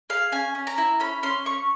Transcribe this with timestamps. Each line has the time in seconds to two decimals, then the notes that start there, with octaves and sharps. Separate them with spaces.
0.10 G#4 F5
0.32 C#4 G#5
0.55 C#4
0.67 A#5
0.78 E4
1.00 C#4 B5
1.23 C#4 C6
1.45 C#4 C#6